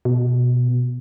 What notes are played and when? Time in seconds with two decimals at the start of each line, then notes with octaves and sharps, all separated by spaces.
0.05 B2